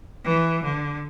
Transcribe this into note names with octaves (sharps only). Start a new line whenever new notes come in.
E3
D3